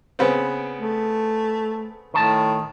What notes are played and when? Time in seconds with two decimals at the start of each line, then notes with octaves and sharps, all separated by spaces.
0.19 C#3 B3 C4
0.79 A3
2.14 A2 D#3 A5